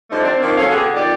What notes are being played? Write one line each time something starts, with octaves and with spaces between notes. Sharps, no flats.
D3 F3 G3 A3 D#4 C5
C4 D4
A#2 D#3 F3 A#3 C4
F#3 C#4 A4 F5
B2 D3 G4 G#4
F2 D#3 G4 D5